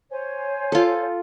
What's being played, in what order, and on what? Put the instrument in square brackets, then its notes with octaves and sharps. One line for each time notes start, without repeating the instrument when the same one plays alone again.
[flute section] C5 C#5 G#5
[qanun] F4 A4